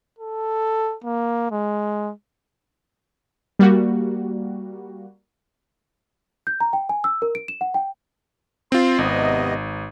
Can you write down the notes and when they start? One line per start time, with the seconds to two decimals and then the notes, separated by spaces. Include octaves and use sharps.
0.19 A4
1.04 A#3
1.51 G#3
3.59 G3 A#3 F#4
6.47 G6
6.60 A#5
6.73 G5
6.89 G#5
7.04 E6
7.22 A#4
7.35 D7
7.48 E7
7.61 F#5
7.74 G5
8.72 C4 F4 C6
8.98 G#1 C3 B3 D#5